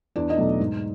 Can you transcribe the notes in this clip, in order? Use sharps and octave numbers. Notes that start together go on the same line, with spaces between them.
E2 D4 D5
D#4 D#5
B2 F#3 A3
G#2